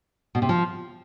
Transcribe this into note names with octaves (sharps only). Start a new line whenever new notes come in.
B2
C3
F3